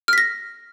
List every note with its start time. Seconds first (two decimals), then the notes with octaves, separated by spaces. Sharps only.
0.08 F6
0.13 B6
0.18 A#6